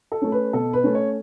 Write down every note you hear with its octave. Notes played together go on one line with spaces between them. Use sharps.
A4
A3 C#4
B4
B2 A4
B4
A3 C#4
C#5